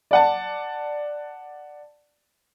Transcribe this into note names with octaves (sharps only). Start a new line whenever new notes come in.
D5 F#5 A5